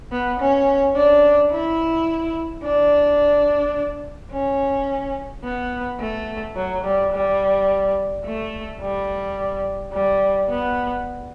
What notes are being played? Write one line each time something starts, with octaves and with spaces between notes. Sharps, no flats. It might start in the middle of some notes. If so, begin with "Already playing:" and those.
B3
C#4
D4
E4
D4
C#4
B3
A3
F#3
G3
G3
A3
G3
G3
B3